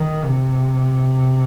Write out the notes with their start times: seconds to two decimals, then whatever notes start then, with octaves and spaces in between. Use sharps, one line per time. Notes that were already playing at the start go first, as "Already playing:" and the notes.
Already playing: D#3
0.24 C3